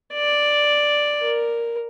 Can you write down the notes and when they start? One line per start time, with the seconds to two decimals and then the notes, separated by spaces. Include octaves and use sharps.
0.14 D5
1.21 A#4